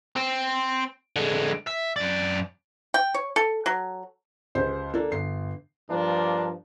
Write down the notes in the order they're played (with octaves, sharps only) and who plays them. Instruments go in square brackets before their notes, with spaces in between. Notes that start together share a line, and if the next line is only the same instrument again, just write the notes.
[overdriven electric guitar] C4
D3 G#3
E5
F#2 D5
[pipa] G5
C#5
A4
F#3
[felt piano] C#2 G4 C5
A#3 D4 A4
G1 C7
[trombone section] G2 F3 A#3 D4